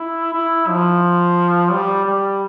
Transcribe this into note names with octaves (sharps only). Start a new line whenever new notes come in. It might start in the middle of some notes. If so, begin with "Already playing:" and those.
Already playing: E4
E4
F3
G3
G3